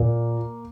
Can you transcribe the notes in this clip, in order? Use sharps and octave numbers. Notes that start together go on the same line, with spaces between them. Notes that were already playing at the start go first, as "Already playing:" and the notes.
Already playing: A#2 A#3